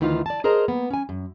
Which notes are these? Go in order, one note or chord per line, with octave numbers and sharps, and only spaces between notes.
D2 D#3 E3 D#4 F4 F5
D5 A5
G#4 A#4 C5 D#5 A#5
A#3 B3
C#4 G#5
F#2